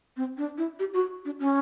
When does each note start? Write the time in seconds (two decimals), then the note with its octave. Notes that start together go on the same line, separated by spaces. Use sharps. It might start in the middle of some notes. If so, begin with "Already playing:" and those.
0.17 C4
0.37 D4
0.58 E4
0.79 G4
0.94 F#4
1.25 D4
1.40 C#4